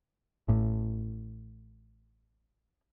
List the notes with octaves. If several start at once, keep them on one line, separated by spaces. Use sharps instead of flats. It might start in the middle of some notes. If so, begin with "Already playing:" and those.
A1 A2